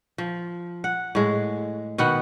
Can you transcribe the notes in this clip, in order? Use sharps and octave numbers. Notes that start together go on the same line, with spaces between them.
F3
F#5
A2 G#3
B2 D#3 B3 F#5